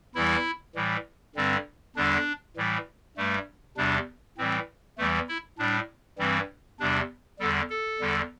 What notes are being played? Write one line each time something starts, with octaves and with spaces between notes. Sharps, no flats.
E2 E3 G3 E4
A2 E3 G3
G2 D3 G3 C4
E2 D3 G3 D4
A2 E3 G3
G2 G3 A3
E2 C3 G3 D4
A2 E3 G3 C4
E2 E3 G3 A3
E4
A2 G3 D4
G2 E3 G3 C4
E2 C3 G3 D4
E2 D3 G3 A4
A4
E2 D3 G3